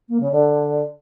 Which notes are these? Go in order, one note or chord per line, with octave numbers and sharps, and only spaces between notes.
A#3
C#3
D3